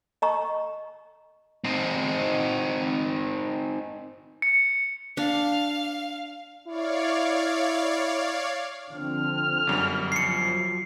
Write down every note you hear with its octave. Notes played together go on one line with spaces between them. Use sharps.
D#5 A#5 C#6
C4 D#4
C#7
D4 F5
E4 C#5 D5 F5
D3 F3 C4 F6
G1 F#2 G3
F3 F#3 C7 C#7